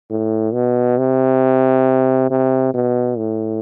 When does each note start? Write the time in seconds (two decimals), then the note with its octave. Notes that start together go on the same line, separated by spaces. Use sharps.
0.10 A2
0.53 B2
0.98 C3
2.30 C3
2.74 B2
3.18 A2